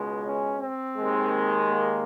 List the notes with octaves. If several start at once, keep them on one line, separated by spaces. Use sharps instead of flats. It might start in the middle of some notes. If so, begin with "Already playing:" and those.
Already playing: C#2 B2 G#3
C#4
C4
D#2 D#3 G#3
A#3